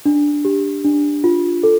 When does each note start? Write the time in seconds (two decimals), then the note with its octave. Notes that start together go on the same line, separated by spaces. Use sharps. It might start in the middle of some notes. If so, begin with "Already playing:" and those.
0.05 D4
0.45 G4
0.85 D4
1.24 F4
1.63 A4